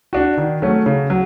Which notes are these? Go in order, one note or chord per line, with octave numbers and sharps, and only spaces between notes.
D4 F#4
D#3
F#3 A3 C#4
C#3
F#3